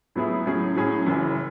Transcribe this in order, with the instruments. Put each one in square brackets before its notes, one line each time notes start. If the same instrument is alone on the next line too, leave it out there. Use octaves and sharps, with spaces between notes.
[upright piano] A2 F#3 B3 E4 G#4
A2 F#3 C#4 G#4
A2 F#3 C#4 G#4
F#1 F#2 E3